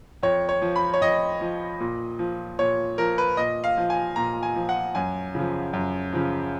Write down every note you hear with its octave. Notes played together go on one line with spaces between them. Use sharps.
F2 C#5
C#5
F3
B5
C#5
F2 D#5
F3
A#2
F3
A#2 C#5
F3 A#4
B4
A#2 D#5
F5
F3
G#5
A#2 A#5
G#5
F3
F#5
F#2 G#5
C#3 F3
F#2
C#3 F3